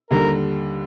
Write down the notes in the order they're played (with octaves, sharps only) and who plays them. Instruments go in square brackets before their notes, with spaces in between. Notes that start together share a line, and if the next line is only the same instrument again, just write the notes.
[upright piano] D#2 D3 G3 [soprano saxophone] A#4